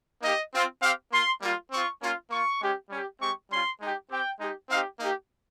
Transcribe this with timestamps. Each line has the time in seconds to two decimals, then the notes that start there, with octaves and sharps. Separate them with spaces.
0.22 A#3 D#4 G4 D#5
0.52 C4 F4
0.81 C4 G4 F5
1.11 A#3 F4 C6
1.42 G3 A#3 F4
1.71 C4 F4 C#6
2.02 A#3 C#4 F4
2.30 A#3 F4 C#6
2.61 G#3 C#4 G4
2.90 G3 C#4 G4
3.20 G#3 C4 G4 C#6
3.50 G3 C#4 F4 C6
3.81 G#3 D#4 G4
4.10 C4 G4 G5
4.40 G#3 D#4 G4
4.70 C4 D#4 G4 F5
5.00 A#3 D#4 G4